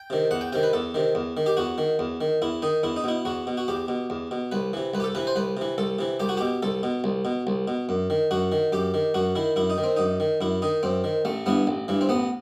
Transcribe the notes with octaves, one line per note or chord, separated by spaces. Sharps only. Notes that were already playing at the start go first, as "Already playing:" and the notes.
Already playing: G5
C3 D#3
E2 F#5
G5
C3 D#3 G5
B4
E2 A4
C3 D#3
E2
D#3
G4
E2 F#4
D#3
E2
D#3
E2 E4
D#3 D#4
E2 E4
D#4
B2 E4
E2 F#4
B2
F#4
E2 G4
B2
E2
B2
C2 B4
C3 E3
C2 B4
G4
A4
C3 E3 B4
C5
C2 B4
C3 E3
C2 A4
C3 E3
C2 G4
F#4
B2 G4
C2 A4
B2
C2
B2
C2
B2
F#2
D#3
F#2 F#4
D#3
F#2 G4
D#3
F#2 F#4
D#3 E4
F#2 E4
D#4
D#3
C4
F#2 D#4
D#3
F#2 E4
D#3 D#4
F#2 C4
D#3
A1 A3
G2 E3 B3
A1
G2 E3
C4
A1 B3